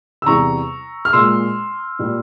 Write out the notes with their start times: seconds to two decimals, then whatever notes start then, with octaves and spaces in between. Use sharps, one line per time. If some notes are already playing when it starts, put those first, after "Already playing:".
0.22 E6
0.26 E2 C3 G3 A#5 C#6
1.05 F6
1.13 A#2 G#3 C6 E6
1.99 A#2 G3